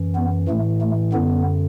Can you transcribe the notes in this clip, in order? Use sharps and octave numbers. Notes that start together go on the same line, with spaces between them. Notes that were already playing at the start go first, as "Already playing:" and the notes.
Already playing: F#2 E3
B3
A2 E3 A3
A3
F#2 D3 B3